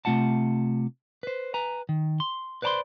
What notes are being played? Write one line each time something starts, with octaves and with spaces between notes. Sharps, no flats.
C3 A3 F4 F#5 A5
B4 C5
B4 G#5 A#5
D#3
C6
B4 C5 D5 A5 B5 C6